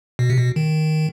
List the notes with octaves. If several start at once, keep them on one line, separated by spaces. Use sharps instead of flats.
B2
C3
B2
D#3